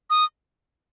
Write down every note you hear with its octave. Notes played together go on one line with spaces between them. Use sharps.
D#6